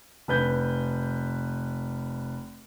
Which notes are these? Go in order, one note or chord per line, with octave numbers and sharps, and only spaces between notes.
F1 B4 G6